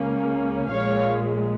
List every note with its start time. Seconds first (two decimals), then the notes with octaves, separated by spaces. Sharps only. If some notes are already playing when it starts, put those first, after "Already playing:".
Already playing: C#2 C#3 A#3 C#4
0.70 A#1 A#2 G#3 C#5 F5